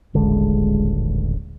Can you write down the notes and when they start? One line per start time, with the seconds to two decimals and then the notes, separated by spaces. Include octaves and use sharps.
0.15 D#1 A1 D3 G#3